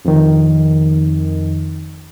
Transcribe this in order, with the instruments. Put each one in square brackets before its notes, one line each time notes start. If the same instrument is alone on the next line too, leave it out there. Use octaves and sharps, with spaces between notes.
[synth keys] F2 D#3